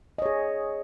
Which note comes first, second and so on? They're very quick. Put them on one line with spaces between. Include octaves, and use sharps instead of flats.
D#5 C#5 G#4